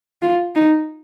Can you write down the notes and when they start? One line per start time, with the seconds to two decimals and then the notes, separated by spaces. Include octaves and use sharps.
0.22 F4
0.55 D#4